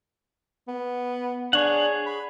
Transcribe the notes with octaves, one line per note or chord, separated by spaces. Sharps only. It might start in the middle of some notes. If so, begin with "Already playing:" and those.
B3
D4 G#4 C#5 F#5
B5